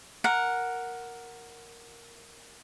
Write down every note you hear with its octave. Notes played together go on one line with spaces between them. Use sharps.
A#4 F#5